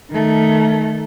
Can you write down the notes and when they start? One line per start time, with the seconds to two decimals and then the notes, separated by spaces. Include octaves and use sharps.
0.11 D#3 A3